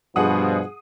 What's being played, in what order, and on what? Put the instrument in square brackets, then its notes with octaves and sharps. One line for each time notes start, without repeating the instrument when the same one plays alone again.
[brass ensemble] G2 B2 F3 [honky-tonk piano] G#4 F#5 D#6